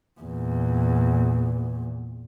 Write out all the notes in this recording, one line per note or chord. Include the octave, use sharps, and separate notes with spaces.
E2 A#2